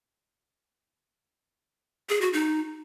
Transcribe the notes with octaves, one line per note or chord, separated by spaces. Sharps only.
G#4
F#4
D#4